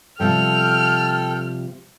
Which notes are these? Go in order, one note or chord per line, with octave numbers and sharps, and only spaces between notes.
C3 F3 G3 A4 G5 F6